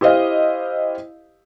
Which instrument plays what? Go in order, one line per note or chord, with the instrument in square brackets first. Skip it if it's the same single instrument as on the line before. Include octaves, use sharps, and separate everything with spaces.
[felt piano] E4 G4 C5 D#5 F5